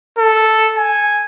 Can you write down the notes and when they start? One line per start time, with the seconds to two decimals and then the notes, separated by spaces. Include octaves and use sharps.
0.18 A4
0.77 G#5